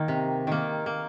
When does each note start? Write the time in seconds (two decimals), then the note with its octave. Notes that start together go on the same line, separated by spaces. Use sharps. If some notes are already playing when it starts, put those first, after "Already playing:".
Already playing: D#3 A#3
0.08 C3
0.47 D#3 A#3
0.86 A#3